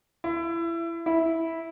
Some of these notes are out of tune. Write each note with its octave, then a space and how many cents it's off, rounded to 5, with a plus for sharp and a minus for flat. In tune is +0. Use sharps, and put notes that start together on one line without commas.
E4 +25
E4 -10